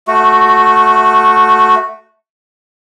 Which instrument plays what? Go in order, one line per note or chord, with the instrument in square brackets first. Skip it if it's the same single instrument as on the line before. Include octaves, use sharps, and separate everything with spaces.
[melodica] A3 F#4